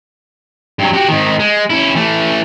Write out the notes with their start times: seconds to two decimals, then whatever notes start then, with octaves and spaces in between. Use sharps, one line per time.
0.79 G2 F#3
0.94 F#4 G4
1.09 G#2 D#3
1.39 G#3
1.70 C#4 E4
1.95 E3 A3